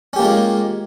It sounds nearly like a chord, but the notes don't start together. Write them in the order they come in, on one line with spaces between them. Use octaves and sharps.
C#4 G4 A#3 F4 G#3